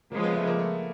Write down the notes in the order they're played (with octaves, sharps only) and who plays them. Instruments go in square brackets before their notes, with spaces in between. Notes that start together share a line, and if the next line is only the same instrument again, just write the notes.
[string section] C#3 F3 G#3 [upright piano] A#3
[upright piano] B3
A3
A#3
A3